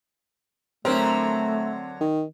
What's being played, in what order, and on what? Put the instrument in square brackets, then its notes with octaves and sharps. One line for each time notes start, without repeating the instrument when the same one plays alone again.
[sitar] D3 F#3 A#4 [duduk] A3 [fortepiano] C4
[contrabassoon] D#3